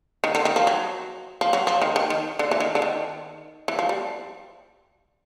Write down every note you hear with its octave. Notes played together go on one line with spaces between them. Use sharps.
D#3
D3
D#3
F3
F#3
F3
F#3
F3
D#3
D#3
D#3
D3
E3
D#3
D3
D#3
E3
F3
G3